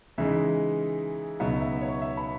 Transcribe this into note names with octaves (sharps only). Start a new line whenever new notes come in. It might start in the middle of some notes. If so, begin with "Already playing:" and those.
C#3 E3 G#3 D#4 E5
C#2 B2 F#3 B3 D#4 E5
E5
C#5
E5
B5